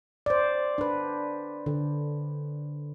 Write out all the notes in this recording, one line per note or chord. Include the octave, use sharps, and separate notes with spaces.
C5 D5
D4 B4
D3